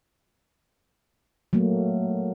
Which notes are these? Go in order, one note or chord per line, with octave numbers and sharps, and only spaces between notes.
F#3 A3 A#3